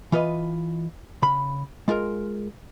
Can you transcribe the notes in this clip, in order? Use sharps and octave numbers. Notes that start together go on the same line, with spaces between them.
E3 F4 B4 D#5
C#3 B5
G#3 F4 G#4 A#4